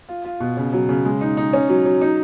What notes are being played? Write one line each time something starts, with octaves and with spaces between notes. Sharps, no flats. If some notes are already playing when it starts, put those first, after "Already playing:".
F4
F4
B2
C#3
F#3
C#3
G#3
D#4
D#4
C#4
F#3
F#3
D#4